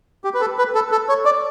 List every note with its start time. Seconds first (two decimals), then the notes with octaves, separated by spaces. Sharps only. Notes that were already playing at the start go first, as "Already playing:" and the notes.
0.24 G4
0.34 B4
0.41 A4
0.58 B4
0.75 A4
0.92 A4
1.09 C#5
1.25 D5